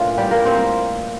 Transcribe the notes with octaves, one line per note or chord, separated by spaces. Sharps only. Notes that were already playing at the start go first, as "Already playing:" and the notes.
Already playing: A2 E3 A#3 D4 F4
G3 G4
A#3 A#4
C4 C5